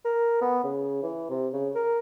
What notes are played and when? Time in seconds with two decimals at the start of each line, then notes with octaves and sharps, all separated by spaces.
0.05 A#4
0.41 B3
0.64 C#3
1.03 E3
1.30 C3
1.53 C#3
1.75 A#4